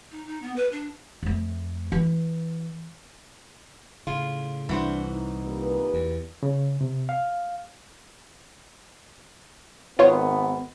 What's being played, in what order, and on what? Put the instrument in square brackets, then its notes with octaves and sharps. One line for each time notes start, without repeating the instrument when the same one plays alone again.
[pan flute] D#4
D#4
B3
B4
D4
[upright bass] F2 A3
E3
[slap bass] A2 C#3 [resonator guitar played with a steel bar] F4
[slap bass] C2 [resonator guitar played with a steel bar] E3 F#4 C5 [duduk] D4
[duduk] D#4
[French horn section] A#2 G4 B4
[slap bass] E2
[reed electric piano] C#3
C3
F5
[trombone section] G#1 D#3 B3 [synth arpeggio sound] F4 C5 C#5